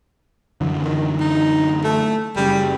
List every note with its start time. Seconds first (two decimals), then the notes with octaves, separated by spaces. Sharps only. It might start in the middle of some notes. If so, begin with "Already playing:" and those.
0.61 F#2 D3 E3
0.85 D#3
1.20 D#4
1.84 A3
2.36 F#1 F#2 C#3 G3